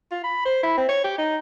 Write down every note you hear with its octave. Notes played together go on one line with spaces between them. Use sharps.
F4
B5
C5
E4
C4
C#5
G4
D#4